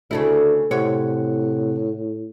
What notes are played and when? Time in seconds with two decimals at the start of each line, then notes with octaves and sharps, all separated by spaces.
0.11 D2 C#3 A3 E4
0.71 A2 C3 C4 C#5 F#5